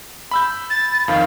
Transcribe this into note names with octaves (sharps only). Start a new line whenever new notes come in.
B5 E6 G6
A6
F2 D#3 F5